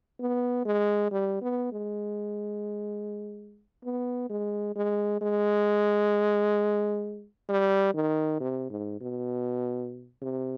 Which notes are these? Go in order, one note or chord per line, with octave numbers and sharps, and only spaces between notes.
B3
G#3
G3
B3
G#3
B3
G#3
G#3
G#3
G3
D#3
C3
G#2
B2
C3